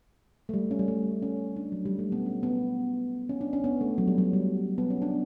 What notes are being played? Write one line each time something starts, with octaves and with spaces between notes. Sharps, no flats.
A3
G3
C#4
G3
A3
C#4
D4
F#3
G3
A3
B3
C#4
B3
C#4
D4
C#4
B3
A3
F#3
G3
F#3
G3
B3
C#4
D4